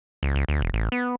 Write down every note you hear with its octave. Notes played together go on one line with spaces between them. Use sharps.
C#2
C#2
D2
E1
A1
B3